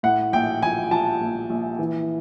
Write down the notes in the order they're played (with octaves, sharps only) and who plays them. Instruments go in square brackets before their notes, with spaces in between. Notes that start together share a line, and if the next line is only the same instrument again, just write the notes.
[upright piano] A2 F#5
A#1 G5
F3 G#5
F3 A5
A#1
A#1
E3